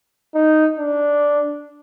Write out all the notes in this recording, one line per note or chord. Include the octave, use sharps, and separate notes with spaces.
D#4
D4